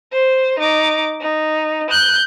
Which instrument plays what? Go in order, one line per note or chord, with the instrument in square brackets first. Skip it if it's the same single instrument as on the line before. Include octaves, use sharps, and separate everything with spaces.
[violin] C5
D#4 D6
D#4
F#6 G6